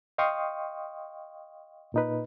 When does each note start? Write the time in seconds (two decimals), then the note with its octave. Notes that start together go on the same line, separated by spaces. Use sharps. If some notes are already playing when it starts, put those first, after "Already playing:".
0.18 D#5 F5 G5 C6 C#6 D#6
1.94 A#2 D#4 B4